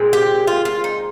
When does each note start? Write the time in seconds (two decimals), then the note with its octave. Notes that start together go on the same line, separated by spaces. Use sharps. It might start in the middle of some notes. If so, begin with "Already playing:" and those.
Already playing: A#2 G#3 C4
0.13 G4
0.47 F4
0.65 F4
0.84 D#4